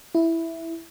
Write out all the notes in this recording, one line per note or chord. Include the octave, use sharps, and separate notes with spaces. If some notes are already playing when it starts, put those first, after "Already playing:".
E4